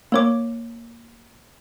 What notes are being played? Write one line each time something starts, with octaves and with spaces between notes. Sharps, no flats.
A#3 C#5 D6